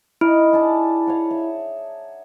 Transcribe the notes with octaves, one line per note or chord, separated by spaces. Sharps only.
D#4 E4
G#4 D5 A5
C#5 F5 F#5
E5